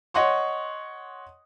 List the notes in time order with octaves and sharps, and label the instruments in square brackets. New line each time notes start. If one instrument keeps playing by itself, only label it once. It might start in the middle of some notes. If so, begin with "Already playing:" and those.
[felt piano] C#5 D#5 F#5 C6 C#6